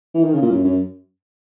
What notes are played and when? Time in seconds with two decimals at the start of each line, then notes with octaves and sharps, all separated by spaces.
0.15 E3
0.24 D#3
0.34 C#3
0.42 A#2
0.51 F#2
0.65 F#2